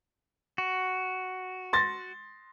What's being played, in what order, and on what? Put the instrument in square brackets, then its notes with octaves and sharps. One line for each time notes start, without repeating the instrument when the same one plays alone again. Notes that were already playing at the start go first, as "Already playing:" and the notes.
[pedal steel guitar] F#4
[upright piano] C6 A6 A#6